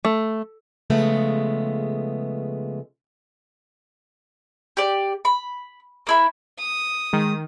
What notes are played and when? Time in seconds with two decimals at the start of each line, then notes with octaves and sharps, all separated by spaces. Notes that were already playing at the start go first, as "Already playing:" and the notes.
0.05 A3
0.90 C#3 F3 G#3 A3 B3
4.77 G4 D5
5.25 B5
6.07 A#3 E4 B5
6.59 D#6
7.13 D#3 G#3